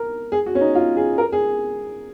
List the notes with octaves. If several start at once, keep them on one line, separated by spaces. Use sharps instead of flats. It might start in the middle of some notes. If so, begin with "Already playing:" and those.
Already playing: A#4
G#4
F#4
C#4
D#4
F4
G#4
A#4
G#4